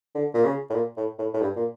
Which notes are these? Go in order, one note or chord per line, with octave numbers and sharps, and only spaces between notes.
D3
A#2
C#3
A2
A#2
A2
A2
A2
G2
A#2